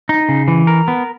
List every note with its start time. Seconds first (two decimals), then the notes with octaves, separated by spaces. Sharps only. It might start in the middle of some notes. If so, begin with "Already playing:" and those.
0.09 D#4
0.29 C#3
0.48 E3
0.67 A#4
0.88 B3